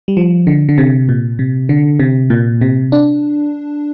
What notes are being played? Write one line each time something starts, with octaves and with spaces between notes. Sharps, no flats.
G3
F3
D3
D3
C3
A#2
C3
D3
C3
A#2
C3
D4